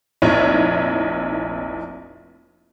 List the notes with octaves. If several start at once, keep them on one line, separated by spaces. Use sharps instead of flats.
F1 A#1 D#4 E4 C#5